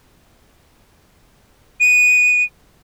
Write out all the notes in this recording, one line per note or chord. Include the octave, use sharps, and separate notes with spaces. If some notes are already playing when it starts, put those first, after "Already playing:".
D#7